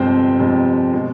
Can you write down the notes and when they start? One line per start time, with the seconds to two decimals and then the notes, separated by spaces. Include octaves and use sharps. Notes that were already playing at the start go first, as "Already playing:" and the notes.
Already playing: G1 F2 C3 F3 G#3 C4 C5
0.39 G1 F2 C3 F3 G#3
0.93 B2 G#3